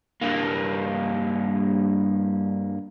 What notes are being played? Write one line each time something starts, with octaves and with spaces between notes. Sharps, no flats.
G2 A#3